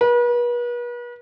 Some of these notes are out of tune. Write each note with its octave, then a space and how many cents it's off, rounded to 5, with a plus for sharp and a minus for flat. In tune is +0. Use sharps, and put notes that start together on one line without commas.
B4 -40